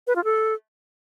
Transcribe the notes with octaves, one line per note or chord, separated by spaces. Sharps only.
B4
F4
A4